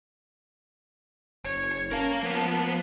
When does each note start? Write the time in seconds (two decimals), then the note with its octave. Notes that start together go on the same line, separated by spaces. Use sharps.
1.44 F#1 C#5
1.92 C#4 A#4 F5 A5
2.23 F3 A#3 B3